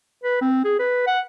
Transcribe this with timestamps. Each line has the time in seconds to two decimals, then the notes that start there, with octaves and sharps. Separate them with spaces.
0.23 B4
0.41 C4
0.64 G#4
0.79 B4
1.07 F#5